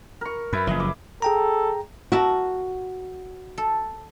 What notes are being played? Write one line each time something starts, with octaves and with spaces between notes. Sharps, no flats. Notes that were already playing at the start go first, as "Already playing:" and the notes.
A#4 C#6
F#2 B4 E5
F#1 F3 G#4 D#5 E5
D6
G#4 A4 G5 A#5
F#4 A#4 E5 A5
A4